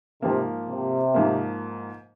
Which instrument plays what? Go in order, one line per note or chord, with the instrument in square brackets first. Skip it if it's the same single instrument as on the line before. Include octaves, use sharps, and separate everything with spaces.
[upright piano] G#2 F3 A#3 [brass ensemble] C3
[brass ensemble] C3
[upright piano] G#2 F3 A#3